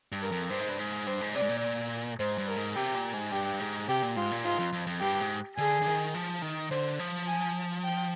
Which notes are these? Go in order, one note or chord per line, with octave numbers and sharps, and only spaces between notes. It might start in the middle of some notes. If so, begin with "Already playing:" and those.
G2
A#4
F2
G2 C5
G#2
G2
G#2
G2 C5
G#2
C3 D5
G#2
A#2
G#2 C5
G2
A#4
G#2
C3 G4
A#2
G#2
G2 G4
G#2
C3 G4
A#2
G#2 F4
A#2
G#2 F4
F2
F2
F2
G2 G4
G#2
D3 G#4
D3
D#3
F3
D#3
D3 C5
F3
G#5
G5